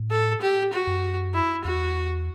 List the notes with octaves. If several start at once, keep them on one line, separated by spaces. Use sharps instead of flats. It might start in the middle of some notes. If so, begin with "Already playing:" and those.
Already playing: A2
A4
G4
F#4
F#2
E4
E2 F#4